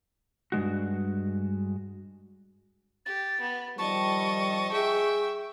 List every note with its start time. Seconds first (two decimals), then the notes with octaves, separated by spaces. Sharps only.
0.52 G2 B2 G#3 F#4
3.06 G4 A6
3.41 B3
3.78 D#3 F3 G3 D#5 A5 C#6
4.72 G#4 E5 G5